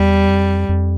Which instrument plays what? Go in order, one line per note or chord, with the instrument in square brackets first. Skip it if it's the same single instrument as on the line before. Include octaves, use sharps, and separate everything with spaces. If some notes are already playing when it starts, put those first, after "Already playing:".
Already playing: [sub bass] E2 [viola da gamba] G3
[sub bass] F2
F2